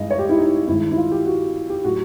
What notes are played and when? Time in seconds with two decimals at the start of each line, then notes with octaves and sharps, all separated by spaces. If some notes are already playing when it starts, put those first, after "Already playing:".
Already playing: G2 E3 G#3 D#5
0.11 C#5
0.19 G4
0.29 E4
0.39 D#4
0.67 G2 D#3 G#3 E4
0.91 E4
0.97 F4
1.12 G4
1.26 F#4
1.70 G4
1.84 A2 F#3 A3 F#4